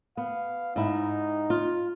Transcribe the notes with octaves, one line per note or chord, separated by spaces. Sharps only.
B3 F5
G#2 D#4 E4
F4